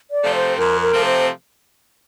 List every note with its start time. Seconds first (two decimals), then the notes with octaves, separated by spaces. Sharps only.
0.11 D5
0.23 C3 F3 A3 C4
0.35 C5
0.58 F2 A#4
0.81 A#4
0.93 C3 F3 A3 C4
1.05 C5